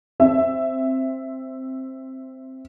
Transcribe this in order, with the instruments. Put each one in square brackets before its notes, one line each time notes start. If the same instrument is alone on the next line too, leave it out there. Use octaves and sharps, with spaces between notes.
[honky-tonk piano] C4 E5